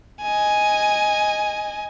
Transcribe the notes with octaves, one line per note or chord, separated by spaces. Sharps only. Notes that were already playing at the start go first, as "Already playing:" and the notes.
D#5 G#5